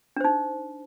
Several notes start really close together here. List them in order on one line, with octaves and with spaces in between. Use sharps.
D4 C5 D#4